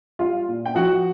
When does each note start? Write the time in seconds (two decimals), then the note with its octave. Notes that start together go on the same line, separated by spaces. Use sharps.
0.19 G3 F4 F5
0.48 A#2
0.66 G5
0.75 F3 F#4 F#5